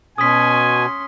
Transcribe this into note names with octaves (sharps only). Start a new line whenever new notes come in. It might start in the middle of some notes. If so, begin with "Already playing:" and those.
B2 C#4 G#5 C6 D#6 B6